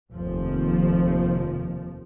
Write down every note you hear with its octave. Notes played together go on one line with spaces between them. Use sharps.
F1 D#2 F3